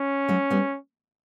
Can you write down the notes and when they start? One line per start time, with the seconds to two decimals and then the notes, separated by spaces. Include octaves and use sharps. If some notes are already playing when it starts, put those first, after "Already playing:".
Already playing: C#4
0.28 F#3 A3
0.50 G3 B3